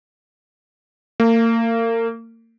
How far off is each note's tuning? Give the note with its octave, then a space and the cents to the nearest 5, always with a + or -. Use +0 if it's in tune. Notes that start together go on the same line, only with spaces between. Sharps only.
A#3 -35